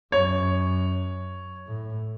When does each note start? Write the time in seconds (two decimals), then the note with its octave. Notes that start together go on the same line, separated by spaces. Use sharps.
0.12 F#2 C#5
1.67 A2